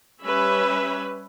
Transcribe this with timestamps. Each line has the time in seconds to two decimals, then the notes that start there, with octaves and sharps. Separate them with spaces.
0.24 G3 C#4 B4 C#5 E5 B5